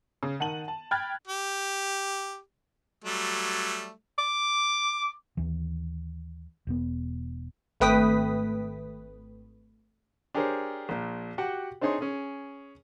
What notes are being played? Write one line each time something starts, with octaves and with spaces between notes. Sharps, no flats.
C#3
D#3 F#5 A5 D#7 F#7
A5
G5 B5 F6 F#6 G#6 A6
G4
F#3 G3 A3
D6
D#2 E3
E1 B3
G#1 A3 B4 G5 D#6 B6
D4 G4 G#4 A#4 C5 C#5
A#1 A#2
F#4 G4 F#5 G5
C4 D4 D#4 G#4 C#5 C6
C#4 G#4